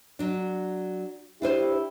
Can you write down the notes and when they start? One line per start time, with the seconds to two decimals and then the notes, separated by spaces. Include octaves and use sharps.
0.19 F#3 D4
1.42 D4 E4 G4 B4 C5